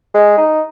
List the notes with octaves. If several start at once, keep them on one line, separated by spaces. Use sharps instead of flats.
G#3
D#4